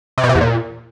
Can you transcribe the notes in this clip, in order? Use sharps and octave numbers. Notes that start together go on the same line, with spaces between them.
C3
B2
C3
E2
A#2